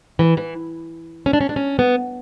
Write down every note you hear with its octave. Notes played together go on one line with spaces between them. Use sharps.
E3
E3
C#4
D4
C#4
D4
C#4
B3